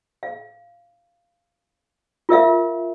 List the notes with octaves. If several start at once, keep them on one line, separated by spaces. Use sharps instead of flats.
F5
F4 A#4 E5 F5